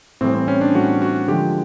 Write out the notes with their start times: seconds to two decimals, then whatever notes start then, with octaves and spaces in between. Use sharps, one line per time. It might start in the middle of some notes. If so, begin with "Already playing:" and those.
0.21 A2 E3 G3 C4
0.34 C4
0.48 C#4
0.61 D4
0.74 A2 E3 G3 F#4
1.02 F#4
1.28 D3 F3 G#3 G4